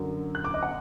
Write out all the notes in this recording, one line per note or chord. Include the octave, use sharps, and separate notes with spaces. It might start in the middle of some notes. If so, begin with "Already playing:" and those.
Already playing: F#2 D3 F#3
F#6
D6
D#5
F#5